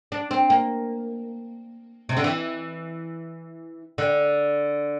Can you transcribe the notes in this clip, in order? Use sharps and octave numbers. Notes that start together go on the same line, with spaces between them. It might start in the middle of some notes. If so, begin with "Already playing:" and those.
D4
C4
A#3
C3
D3
E3
D3